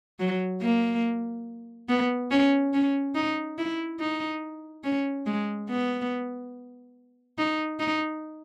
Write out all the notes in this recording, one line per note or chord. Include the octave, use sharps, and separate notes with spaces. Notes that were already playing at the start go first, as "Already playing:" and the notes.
F#3
A#3
B3
C#4
C#4
D#4
E4
D#4
C#4
G#3
B3
D#4
D#4